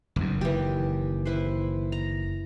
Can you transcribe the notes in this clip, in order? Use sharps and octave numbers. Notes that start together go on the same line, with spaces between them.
F#1 D#2
E3 G4
E4 B4 C5
A#5